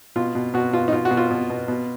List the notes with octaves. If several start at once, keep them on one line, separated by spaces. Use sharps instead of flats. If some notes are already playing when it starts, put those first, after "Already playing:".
B2 F4
B2
B2 F#4
B2 F4
D#4
B2 F4
F#4
B2
F4
B2
B2
B2